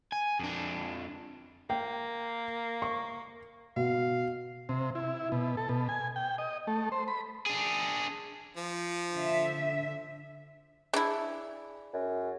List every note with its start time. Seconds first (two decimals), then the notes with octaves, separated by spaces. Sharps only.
0.12 G#5
0.40 F2 D4
1.70 A#3 G5
2.82 C#6
3.76 B2 F5
4.69 C3
4.95 E4
5.32 B2
5.57 A4
5.69 B2
5.89 G#5
6.16 G5
6.38 D#5
6.67 A3
6.92 C5
7.08 B5
7.46 D4 G#4
8.57 F3
9.13 D3 E5
10.94 D4 E4 G#4
11.93 F#2